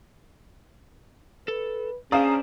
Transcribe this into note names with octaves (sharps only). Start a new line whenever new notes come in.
A4 B4
C#4 D4 G#4 C5 D5 F5 A#5 D#6